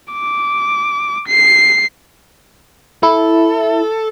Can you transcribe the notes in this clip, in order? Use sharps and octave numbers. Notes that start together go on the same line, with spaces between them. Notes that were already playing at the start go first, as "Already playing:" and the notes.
D6
C7
E4 A4